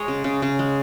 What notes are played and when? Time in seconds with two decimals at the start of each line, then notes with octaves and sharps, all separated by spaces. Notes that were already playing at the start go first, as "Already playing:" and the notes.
Already playing: G#3 C#5 D#5
0.08 C#3
0.24 C#3
0.42 C#3
0.59 G#3